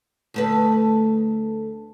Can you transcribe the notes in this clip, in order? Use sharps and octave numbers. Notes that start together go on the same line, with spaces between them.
D2 A3 B4